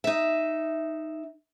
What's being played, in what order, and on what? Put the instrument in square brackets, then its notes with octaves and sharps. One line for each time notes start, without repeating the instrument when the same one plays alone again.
[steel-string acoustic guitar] D#4 E5